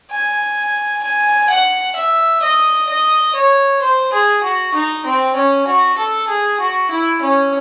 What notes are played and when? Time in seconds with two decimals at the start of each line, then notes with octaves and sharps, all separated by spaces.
0.11 G#5
1.03 G#5
1.50 F#5
1.96 E5
2.42 D#5
2.89 D#5
3.35 C#5
3.82 C5
4.13 G#4
4.43 F#4
4.74 D#4
5.05 C4
5.36 C#4
5.67 F#4
5.98 A4
6.28 G#4
6.60 F#4
6.91 E4
7.22 C#4